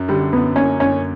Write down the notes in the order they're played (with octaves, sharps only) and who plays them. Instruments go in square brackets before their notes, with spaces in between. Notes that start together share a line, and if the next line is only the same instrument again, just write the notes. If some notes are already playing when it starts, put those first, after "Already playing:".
Already playing: [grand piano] F#2
[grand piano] D3 [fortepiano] G3
[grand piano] F#2 [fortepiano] B3
[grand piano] A#3 [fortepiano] C#4
[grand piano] F#2 [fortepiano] C#4